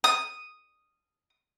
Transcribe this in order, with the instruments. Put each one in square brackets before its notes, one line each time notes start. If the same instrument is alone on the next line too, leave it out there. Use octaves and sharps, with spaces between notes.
[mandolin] D#6